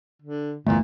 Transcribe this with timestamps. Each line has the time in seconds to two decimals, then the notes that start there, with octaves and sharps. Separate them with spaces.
0.22 D3
0.67 G1 E2 A#2 A3